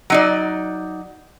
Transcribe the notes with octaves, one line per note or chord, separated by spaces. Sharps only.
F#3 D#4 D5